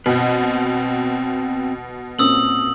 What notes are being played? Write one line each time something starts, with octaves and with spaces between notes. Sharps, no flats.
B2 C4 B4
A#2 C4 C#4 D#6 E6 F#7